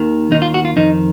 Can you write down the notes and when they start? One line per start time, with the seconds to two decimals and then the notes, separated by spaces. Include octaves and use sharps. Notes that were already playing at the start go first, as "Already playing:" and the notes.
Already playing: D#2 D#3
0.31 D#2 D#3 D#4
0.42 F4
0.54 F#4
0.65 F4
0.76 F2 D#3 D#4